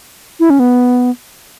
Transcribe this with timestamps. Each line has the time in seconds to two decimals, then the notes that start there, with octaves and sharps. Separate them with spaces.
0.40 E4
0.50 C#4
0.59 B3